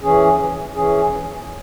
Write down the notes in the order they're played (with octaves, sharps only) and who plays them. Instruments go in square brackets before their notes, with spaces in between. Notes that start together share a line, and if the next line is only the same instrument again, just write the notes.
[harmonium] E3 C#4 G#4
E3 C#4 G#4